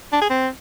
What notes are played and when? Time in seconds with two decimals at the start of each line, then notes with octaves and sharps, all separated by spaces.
0.13 D4
0.21 G#4
0.30 C4